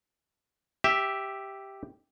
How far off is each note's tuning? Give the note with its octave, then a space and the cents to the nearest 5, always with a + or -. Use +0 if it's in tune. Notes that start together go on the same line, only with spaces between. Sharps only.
G4 +0 E5 +0